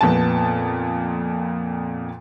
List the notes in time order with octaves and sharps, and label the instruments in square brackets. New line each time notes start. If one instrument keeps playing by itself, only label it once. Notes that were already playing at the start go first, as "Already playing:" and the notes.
[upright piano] F2 A#2 B3 A5